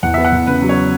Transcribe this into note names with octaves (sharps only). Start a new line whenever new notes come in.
E2 F#5
B3 E5
F#5
E2
C#3 B4
F#3
C#5